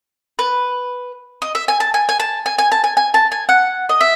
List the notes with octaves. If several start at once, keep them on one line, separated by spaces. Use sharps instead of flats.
B4
D#5
E5
G#5
A5
G#5
G#5
A5
G#5
G#5
A5
G#5
G#5
A5
G#5
F#5
D#5
E5